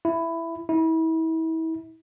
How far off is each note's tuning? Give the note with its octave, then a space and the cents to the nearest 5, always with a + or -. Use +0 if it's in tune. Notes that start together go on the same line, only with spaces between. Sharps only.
E4 +10
E4 -35